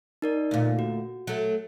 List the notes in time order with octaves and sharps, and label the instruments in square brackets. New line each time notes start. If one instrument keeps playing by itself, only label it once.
[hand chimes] D#4 A#4 D5
[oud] D2 A#2
[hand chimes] F#4
[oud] F#3 A3